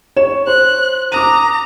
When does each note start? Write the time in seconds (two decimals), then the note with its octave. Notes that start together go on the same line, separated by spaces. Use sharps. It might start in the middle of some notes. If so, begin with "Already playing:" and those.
0.16 C#5 E7
0.47 C5 F#6
1.12 A#5 D6 D#6 D#7